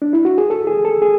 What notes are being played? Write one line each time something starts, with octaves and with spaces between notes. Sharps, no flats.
D4
E4
F#4
G#4
A4
G#4
A4
G#4